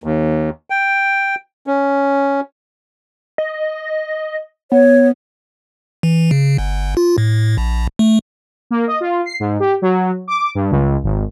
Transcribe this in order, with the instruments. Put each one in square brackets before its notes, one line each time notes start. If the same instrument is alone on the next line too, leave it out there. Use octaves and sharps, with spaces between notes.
[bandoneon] D#2
G5
C#4
[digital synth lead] D#5
[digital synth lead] B3 [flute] C#5
[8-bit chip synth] E3
C#3
G1
F4
A2
A#1
A3
[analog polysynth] A#3
D#5
F4
C7
G#2
G4
F#3
D6
G2
C#2
G#1